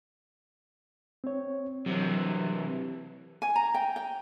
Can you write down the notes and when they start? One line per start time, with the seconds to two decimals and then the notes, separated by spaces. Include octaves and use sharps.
1.24 C4 C#5
1.86 C3 E3 F#3
3.42 G#5
3.56 A#5
3.74 G5
3.96 G5